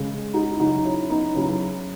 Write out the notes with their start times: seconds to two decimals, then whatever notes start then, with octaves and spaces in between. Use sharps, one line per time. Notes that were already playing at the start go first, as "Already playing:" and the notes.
Already playing: C#3 G#3
0.34 D#4 F#4
0.53 E4
0.59 C#3 F#3 D#4 F#4
0.84 C#4 E4
1.10 B3 D#4
1.35 C#3 F#3 C#4 E4